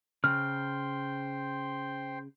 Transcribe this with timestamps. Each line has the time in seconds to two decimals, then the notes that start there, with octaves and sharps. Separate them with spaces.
0.24 C#3 C5 G5 C6 F6